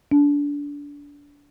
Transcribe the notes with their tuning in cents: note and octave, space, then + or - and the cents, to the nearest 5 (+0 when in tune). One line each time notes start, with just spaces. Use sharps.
D4 -25